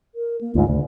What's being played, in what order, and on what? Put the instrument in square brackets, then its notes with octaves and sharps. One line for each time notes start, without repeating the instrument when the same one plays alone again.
[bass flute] A#4
A#3
[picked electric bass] D2 G#2 [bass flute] F4
[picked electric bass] D2 [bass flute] C#3